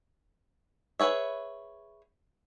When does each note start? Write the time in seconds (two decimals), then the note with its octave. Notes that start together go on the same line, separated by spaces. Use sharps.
1.00 G#4 B4 C#5 E5